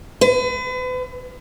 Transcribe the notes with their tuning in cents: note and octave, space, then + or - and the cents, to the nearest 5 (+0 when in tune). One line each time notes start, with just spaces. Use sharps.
B4 +40